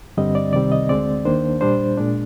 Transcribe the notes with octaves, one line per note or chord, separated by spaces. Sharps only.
G2 D3 G3 C4 D#5
D5
C2 C3 D#3 G3 C4 D5
D#5
D2 D3 G#3 C4 D5
D#2 D#3 A#3 D4 C5
A#2 G3 D4 C5
A#2 G#3 D4